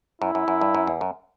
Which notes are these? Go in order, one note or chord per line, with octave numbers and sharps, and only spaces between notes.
F#2 E4
F#2
F#2
G2
F#2
E2
F#2